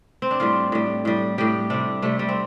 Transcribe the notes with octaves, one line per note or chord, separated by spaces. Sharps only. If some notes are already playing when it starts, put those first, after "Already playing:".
C4
D4
A2 G3 F4
A2 G3
A2 G3
A2 G3 G4
C3 G3 D4
C3 G3 A3
G3
C4